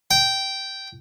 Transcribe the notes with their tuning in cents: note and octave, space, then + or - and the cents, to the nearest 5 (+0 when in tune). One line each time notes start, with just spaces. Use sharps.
G5 -10